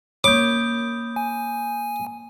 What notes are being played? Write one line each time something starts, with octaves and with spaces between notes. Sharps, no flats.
A#3 C#5 B5 D6 D#6 G6
G#5